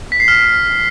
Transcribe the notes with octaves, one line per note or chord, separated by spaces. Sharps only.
B6
C7
F6